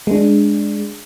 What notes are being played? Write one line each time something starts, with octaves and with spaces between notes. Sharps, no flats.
G#3 D4